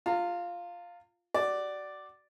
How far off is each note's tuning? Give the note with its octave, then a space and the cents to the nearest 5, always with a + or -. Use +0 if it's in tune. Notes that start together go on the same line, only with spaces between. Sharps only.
F4 +0 A#5 -40
F#4 +25 D5 +0